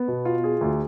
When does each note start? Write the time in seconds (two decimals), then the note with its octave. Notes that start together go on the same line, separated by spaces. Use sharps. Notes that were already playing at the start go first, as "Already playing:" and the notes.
Already playing: B3
0.08 B2
0.25 F4
0.44 G#4
0.61 D2